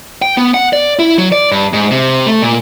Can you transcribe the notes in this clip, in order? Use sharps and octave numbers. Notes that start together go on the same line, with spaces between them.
G5
B3
F#5
D5
E4
F#3
D5
G2
G#2
C3
A3
A#2